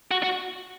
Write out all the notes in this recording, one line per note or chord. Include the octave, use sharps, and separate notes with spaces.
F#4
F#4